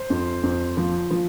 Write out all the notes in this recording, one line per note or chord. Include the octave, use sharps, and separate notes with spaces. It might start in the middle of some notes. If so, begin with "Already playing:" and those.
Already playing: C5
F2
F2
F3
F3